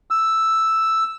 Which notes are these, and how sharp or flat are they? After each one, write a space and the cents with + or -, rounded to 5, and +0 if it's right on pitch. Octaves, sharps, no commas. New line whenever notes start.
E6 +0